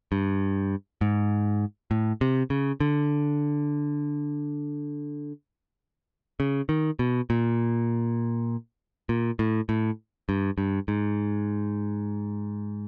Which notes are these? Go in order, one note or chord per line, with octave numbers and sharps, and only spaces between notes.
G2
G#2
A2
C3
C#3
D3
C#3
D#3
B2
A#2
A#2
A2
A2
G2
G2
G#2